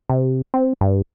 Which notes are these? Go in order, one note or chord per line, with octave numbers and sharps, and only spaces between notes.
C3
C4
G2